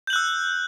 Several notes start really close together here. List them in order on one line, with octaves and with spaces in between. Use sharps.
G6 F#7 F#6 E6